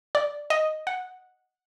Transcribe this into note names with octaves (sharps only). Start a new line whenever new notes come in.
D5
D#5
F#5